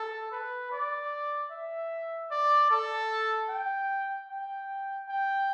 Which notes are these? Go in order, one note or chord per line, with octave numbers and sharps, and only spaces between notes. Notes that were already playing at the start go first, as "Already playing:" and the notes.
Already playing: A4
B4
D5
E5
D5
A4
G5
G5
G5